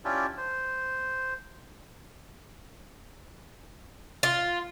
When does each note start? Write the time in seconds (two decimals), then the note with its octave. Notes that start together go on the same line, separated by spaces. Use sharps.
0.05 C#4 D4 E4 F4 G4 D5
0.37 C5
4.23 F4